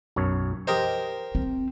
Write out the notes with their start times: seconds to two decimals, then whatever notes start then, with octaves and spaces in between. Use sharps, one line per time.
0.16 B1 F#2 C#5
0.67 G4 A#4 C5 D#5
1.35 C4